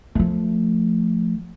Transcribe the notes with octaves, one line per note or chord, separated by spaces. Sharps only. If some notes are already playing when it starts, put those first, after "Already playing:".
F3 A3